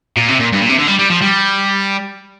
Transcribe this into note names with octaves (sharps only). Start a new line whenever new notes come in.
A#2
C3
A#2
G2
A#2
C3
D3
G3
G3
F3
G3